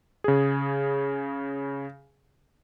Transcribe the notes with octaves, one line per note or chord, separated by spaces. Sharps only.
C#3 G#4